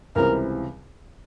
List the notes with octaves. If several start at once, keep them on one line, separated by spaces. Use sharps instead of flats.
C#2 C3 E3 G3 C4 A#4